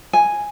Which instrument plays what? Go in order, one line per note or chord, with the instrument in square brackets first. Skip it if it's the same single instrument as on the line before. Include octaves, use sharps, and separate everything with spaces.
[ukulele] G#5